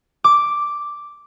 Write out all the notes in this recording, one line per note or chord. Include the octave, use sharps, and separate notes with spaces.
D6